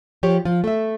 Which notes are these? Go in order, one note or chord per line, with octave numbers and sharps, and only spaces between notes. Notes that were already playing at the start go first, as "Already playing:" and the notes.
F3 G4 C#5
F3 F4
A3 E5